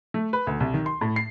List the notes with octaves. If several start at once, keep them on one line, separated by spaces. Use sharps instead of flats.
A3
B4
D2
C2
D#3
C6
A2
C7